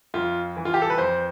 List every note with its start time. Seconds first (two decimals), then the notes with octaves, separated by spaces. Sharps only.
0.14 F2 F4
0.56 E3
0.65 F4
0.74 G4
0.82 A4
0.90 B4
0.98 F2 C5